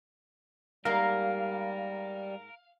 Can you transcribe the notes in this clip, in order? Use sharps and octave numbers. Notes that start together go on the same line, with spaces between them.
G#2 G3 A#3 A#4 F5